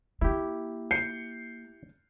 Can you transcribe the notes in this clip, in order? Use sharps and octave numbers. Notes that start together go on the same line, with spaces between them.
A#3 E4 G4
G6 C7 C#7